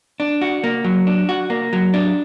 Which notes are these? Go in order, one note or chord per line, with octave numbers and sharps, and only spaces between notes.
D4
F#4
A#3
F#3
D4
F#4
A#3
F#3
D4